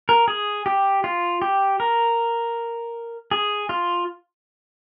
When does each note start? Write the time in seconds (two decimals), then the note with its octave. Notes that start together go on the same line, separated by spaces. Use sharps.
0.09 A#4
0.28 G#4
0.66 G4
1.04 F4
1.42 G4
1.80 A#4
3.31 G#4
3.69 F4